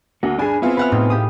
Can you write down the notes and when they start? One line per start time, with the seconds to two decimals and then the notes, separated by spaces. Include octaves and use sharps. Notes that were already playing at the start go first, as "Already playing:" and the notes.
0.23 D2 A#3 F#4
0.38 G2 D4 G#4 G#5
0.62 B3 C4 E4 F4 G#4
0.77 B4 F#5 F6
0.92 A2 D#4
1.10 G4 D#6